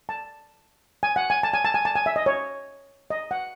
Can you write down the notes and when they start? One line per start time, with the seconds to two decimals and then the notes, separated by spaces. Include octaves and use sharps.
0.09 A5
1.03 G#5
1.16 F#5
1.30 G#5
1.43 A5
1.54 G#5
1.65 A5
1.74 G#5
1.85 A5
1.95 G#5
2.06 E5
2.16 D#5
2.26 C#5
3.10 D#5
3.31 F#5